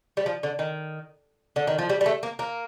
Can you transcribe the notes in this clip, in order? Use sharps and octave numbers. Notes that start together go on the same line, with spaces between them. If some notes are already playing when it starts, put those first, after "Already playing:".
G3
F3
D3
D#3
D3
D#3
F3
G3
G3
A3
A#3
A#3